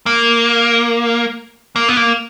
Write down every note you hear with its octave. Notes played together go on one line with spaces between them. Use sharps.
A#3
A#3
B3
A#3